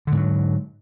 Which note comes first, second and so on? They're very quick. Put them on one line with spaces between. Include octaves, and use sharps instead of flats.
D3 G#2 F#3